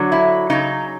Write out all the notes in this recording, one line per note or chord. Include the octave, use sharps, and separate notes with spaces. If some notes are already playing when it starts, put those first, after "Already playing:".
Already playing: D3 F#3
E4
C#3 F#3 D#4